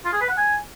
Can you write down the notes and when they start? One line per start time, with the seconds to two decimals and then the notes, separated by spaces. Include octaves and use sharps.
0.05 F4
0.13 G#4
0.21 B4
0.29 F#5
0.37 G#5